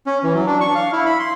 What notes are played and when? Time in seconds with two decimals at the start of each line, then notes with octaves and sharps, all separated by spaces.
0.06 C#4
0.23 E3
0.35 F#3
0.47 D4
0.61 C#6
0.75 F5
0.93 E4
1.06 B5
1.19 C6